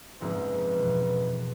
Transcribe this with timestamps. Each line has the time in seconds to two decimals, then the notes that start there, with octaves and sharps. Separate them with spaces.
0.21 F#1 C2 G#2 F3 G#3 C4 B4
0.75 E1 B2 E4